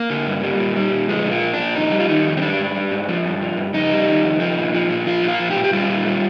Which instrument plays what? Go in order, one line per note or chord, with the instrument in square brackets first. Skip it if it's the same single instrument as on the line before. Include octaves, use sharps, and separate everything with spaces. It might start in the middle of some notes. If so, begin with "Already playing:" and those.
Already playing: [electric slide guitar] A#3
D3
G2
G3
A#2
G3
A#2
F3 G#3
A#2
A#3
F3
D4
A#2
F2 D#4
G3
F4
D#3 D#4
F2
C4
G3 D4
G#2
G3
G#2
F3
G2
F3
G2
F2 D#4
G3
D#3
F2
F3
A#2
F3
A#2
F3 F4
A#2 F4
F3
G4
A#2
G4
G3 F4
A#2
G3